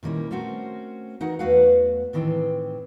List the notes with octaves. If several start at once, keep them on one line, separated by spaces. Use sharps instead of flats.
A#2 D#3 G3 A#3 C#4 E4
A3 C4 C#4 F#4 A#4 C5
E3 D#4 F#4 A#4 F#5
E2 A3 F#4 B4 F5 F#5
A2 D#3 E3 C4 G5